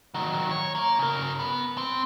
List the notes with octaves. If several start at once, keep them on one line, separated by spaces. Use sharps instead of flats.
D#3 F#3
C#5
A#3
C#3 A#4
B3
C4